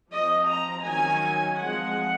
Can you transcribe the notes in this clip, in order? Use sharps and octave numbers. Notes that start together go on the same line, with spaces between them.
F3 C4 D#5
A#5
D#3 F#3 C#4 G#5
F3 G#3 C4 F#5